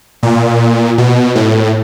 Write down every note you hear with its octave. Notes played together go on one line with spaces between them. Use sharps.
A#2
B2
A2